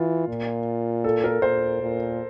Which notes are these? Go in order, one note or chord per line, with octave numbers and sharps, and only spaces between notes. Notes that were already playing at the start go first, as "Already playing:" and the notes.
Already playing: E3 F4
A#2
A4
A#4
A#2 C5
A#2